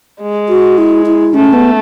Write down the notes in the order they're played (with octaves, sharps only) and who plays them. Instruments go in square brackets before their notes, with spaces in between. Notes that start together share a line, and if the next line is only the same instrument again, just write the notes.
[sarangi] G#3
[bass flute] F#4
E4
E4
[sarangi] A3 [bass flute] C#4
[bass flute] B3